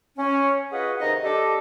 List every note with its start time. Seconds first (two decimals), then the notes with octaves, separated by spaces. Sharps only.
0.16 C#4
0.72 F4 F#4 G#4 B4 D#5 F#5
0.99 C3 D#3 D#4 D#5
1.23 G3 D4 G4 A4 D#5